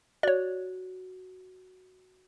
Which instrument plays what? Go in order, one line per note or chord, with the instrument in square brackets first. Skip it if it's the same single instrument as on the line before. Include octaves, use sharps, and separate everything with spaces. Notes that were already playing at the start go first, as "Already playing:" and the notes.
[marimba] F#4 [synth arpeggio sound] C#5 D5